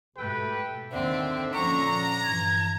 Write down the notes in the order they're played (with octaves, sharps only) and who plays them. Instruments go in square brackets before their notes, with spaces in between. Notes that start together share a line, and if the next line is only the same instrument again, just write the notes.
[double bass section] G#2 B2 A3 [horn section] G4 A4 G5 [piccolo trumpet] B4
[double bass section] D#2 D#3 [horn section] D3 [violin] C4 [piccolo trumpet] E5
[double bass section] A#2 F3 C#4 [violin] A#5 [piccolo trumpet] C#6
[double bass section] G2 E3 [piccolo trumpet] G#6